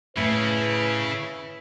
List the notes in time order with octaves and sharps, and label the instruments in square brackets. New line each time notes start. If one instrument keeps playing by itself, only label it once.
[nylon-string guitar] A2 [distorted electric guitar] C#3 [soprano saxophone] E4 [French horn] B4